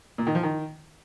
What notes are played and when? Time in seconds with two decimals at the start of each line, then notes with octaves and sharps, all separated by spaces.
0.18 A#2
0.27 D#3
0.35 F3
0.43 D#3